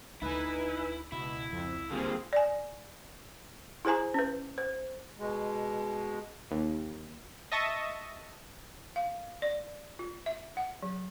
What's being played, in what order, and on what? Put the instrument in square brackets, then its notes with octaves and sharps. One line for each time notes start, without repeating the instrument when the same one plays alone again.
[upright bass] D2 D3 [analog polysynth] D#4 B4 G#5 [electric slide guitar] E4
[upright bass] C#2 [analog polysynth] B2 [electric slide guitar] E4
[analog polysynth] F2
[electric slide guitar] D3 G3 A#3 [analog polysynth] C4 F4 G#4
[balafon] D5 G#5
E4 G#4 C5 G#5 A#5
C#4 B4
C5
[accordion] B2 G#3
[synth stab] D#2
D#5 E5 A5 C#6 A#6 D#7
[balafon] F5
D5
F4
E5
F#5
F#3